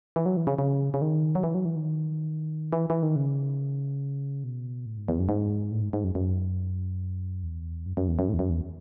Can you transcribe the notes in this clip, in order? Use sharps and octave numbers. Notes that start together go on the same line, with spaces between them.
E3
F#3
E3
C#3
C#3
C#3
D#3
F#3
E3
F#3
E3
D#3
E3
E3
D#3
C#3
B2
A2
G#2
E2
F#2
G#2
A2
G#2
G#2
F#2
F#2
E2
F#2
F#2
E2
F#2
A2
E2
F#2
E2